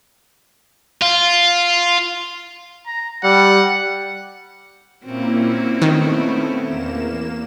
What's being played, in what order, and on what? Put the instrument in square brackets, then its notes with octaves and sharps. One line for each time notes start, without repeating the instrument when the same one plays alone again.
[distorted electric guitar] F4
[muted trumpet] A#5
[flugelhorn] G3 [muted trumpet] F#5
[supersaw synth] A#2 A#3 E4 [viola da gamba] C4 C#4 F#4
[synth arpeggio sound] D#3 [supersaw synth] A3 B3 E4
[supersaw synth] E2 A#3 E7